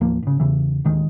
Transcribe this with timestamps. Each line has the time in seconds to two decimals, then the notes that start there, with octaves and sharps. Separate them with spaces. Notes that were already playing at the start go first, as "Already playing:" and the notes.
0.01 A1 D#2 F3 A#3
0.22 G#1 C#3
0.40 E2 C#3 E3
0.84 D1 D#2 D#3 G#3